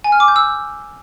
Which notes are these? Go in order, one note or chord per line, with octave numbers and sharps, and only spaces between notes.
G#5
F6
D6
G6
E6